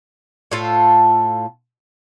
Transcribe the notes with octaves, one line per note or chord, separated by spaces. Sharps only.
A2 F4 A4